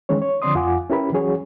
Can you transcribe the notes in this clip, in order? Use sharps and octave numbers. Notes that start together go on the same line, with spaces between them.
D#3 E3 G#3 C#4 C#5
C#5
D3 F3 C4 D5 C6 D#6
F2 F4 F#5 G#5 D6
C#4 E4 G4 A#4 B4 B5
E3 F#3 C#4 F#4 G#4 C#5